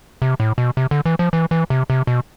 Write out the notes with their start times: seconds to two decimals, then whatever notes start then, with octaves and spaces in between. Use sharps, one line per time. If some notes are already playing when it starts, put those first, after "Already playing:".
0.22 C3
0.40 A2
0.58 B2
0.77 C3
0.91 D3
1.06 E3
1.19 F3
1.33 E3
1.51 E3
1.70 C3
1.90 C3
2.07 B2